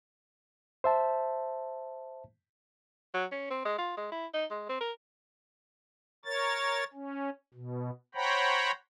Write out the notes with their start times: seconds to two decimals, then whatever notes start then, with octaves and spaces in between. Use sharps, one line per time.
0.84 C5 E5 A5
3.14 F#3
3.32 C#4
3.50 C4
3.65 G#3
3.78 F4
3.97 G#3
4.12 E4
4.34 D#4
4.51 G#3
4.69 C4
4.81 A#4
6.25 A#4 C#5 A6
6.93 C#4
7.54 B2
8.15 C5 C#5 F#5 G5 A#5 B5